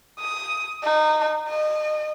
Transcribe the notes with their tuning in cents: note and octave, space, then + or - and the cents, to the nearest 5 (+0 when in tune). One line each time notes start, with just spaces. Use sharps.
D#6 +10
D#4 -20
D#5 -30